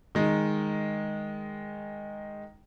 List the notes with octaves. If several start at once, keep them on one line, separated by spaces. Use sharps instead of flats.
D#3 G#3